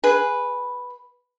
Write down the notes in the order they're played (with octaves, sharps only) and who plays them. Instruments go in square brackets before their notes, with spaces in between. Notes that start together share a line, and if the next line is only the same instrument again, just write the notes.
[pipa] G#4 B4